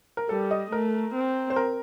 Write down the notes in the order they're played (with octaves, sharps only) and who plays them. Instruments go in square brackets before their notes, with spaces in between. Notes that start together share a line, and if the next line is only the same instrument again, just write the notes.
[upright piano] A#4
[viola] G3 [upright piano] A4
[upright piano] D#5
[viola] A3 [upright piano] A#4
[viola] C4
[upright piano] C5
A#4